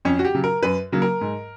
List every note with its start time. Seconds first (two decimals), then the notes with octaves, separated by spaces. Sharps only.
0.05 F2 C#4
0.19 F#4
0.25 G4
0.35 C#3 F#3
0.44 A#4
0.63 F#2 B4
0.92 C#3 F#3 A#3
1.02 A#4
1.21 G#2